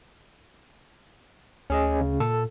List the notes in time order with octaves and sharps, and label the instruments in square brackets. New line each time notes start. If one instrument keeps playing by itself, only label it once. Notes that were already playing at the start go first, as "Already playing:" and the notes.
[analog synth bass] D2 [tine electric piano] C#4 G#4 D#5
[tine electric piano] C#3
[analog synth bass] A#2 [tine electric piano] A4